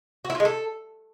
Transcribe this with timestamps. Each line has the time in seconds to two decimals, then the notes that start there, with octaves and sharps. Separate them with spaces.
0.25 F#4
0.30 E4
0.35 F4
0.40 G#3
0.45 A4